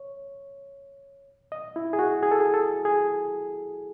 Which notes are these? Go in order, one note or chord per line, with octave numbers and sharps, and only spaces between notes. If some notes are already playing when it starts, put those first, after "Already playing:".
Already playing: C#5
D#5
E4
G#4
F#4
G#4
A4
G#4
A4
G#4